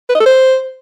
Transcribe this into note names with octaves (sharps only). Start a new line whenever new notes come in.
B4
D#5
A4
C5